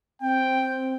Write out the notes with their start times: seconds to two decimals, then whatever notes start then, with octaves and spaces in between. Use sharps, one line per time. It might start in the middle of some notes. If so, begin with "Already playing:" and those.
0.22 C4 G5